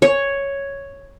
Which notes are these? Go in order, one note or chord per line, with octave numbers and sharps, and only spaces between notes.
C#5